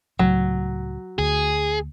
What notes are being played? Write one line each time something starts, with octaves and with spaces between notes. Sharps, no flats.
C#2 A2 F#3
D2 G#4